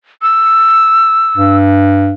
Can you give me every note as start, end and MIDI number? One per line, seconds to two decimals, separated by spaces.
0.22 1.56 88
1.38 2.14 43